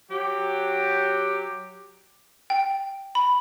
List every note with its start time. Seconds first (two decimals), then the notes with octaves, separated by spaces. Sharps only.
0.10 F#3 G4
2.50 G5
3.15 B5